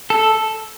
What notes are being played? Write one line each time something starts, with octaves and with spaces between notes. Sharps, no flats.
A4